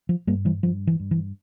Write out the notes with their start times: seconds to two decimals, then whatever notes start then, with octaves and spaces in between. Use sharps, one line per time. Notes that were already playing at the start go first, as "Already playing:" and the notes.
0.09 F3
0.27 G2 G3 A#3
0.45 E3 G3
0.63 G2 F3
0.87 E3
1.00 G2
1.11 E3